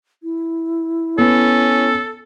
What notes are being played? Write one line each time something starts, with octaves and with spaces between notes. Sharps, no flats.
E4
B3 C#4 A4